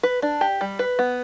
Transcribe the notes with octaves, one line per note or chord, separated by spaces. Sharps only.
B4
D4
G4
G3
B4
B3